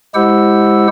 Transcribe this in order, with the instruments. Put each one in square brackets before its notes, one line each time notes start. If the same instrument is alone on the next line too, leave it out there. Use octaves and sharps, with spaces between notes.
[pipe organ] G#3 E4 G4 C5 F#5 E6